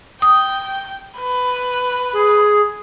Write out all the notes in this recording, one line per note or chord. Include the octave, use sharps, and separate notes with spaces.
G5 D#6
B4
G#4